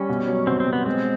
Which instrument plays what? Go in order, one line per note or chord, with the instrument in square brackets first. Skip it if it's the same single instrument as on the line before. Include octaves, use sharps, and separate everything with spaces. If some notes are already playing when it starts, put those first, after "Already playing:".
Already playing: [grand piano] G3 [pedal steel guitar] C#4
[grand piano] B2
F#3
[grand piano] B2 [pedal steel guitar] C4
[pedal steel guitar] C4
[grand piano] B2
[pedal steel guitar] B3
[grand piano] G#3 [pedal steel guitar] C4